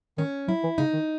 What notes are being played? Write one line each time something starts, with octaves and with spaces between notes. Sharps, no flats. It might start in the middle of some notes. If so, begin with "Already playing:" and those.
D#3 C#4
F#3 E4
E3
C#3 D#4
D#3